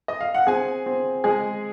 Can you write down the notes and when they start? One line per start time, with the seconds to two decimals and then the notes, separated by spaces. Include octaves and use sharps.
0.08 D#5
0.21 F5
0.34 F#5
0.47 C4 G#4 G#5
0.86 C4
1.24 G#3 G#4 G#5